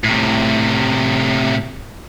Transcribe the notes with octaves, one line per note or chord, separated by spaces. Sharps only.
A2 C3